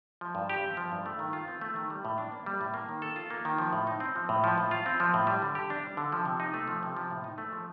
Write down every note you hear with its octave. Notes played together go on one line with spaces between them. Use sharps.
F3
G2
G4
C4
F3
G2
A3
D#3
F4
C4
A3
D#3
G3
A2
D4
A#3
G3
A2
A#3
D#3
A4
F4
A#3
D#3
F3
A2
D#4
C4
F3
A2
F3
A2
F4
C4
F3
A2
G3
D3
G4
D4
G3
D3
F3
C3
D#4
A3
F3
C3
F3
A2
D#4
A3
F3